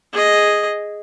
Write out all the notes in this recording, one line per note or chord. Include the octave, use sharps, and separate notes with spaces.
G#4 D#5